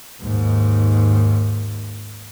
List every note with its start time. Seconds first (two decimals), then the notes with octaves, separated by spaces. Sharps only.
0.22 D#2 G#2